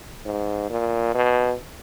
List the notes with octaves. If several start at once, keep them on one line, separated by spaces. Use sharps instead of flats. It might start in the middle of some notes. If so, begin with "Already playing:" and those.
G#2
A#2
B2